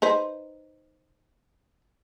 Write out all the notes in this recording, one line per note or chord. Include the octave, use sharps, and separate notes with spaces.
D#4 B4 C5